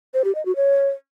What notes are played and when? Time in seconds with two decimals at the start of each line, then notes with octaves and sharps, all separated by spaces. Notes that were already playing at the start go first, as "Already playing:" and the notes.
0.14 C5
0.24 G4
0.35 D#5
0.45 F#4
0.56 C#5